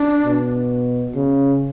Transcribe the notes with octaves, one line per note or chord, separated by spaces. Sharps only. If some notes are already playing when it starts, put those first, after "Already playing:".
Already playing: D4
B2
C#3